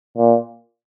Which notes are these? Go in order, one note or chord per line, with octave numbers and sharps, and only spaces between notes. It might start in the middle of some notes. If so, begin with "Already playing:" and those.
A#2